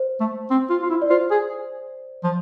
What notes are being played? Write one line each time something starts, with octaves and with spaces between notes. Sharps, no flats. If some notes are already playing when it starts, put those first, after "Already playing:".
Already playing: C5
A3
C4
F4
F4
E4
D5
F4 C5
G#4
F3